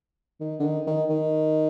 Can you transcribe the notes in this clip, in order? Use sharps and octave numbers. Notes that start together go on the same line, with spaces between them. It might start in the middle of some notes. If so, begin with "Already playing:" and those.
D#3
D3
D#3
D#3
D#3